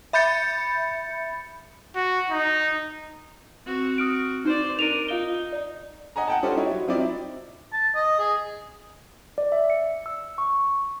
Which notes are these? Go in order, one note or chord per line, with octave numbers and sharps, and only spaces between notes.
E5 B5 G6 A6 C#7
F#4
D#4
C4 F#4
D#6 F6 D7
D#4 C5 D5
D4 A#4 D7 D#7 F7
D#4 F4 F5 G7
D5
D#5 F#5 G#5 A#5
F#5 G5 A5
G3 C#4 F4 A4 C5 D5
D#4 E4 F#4 C#5
F#3
F3 F#3 C4 D#4 E4 D5
A5
D#5
G#4
D5
E5
C#7
E6
C#6